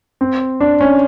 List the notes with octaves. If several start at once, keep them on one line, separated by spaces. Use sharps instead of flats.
C4
D4
C#4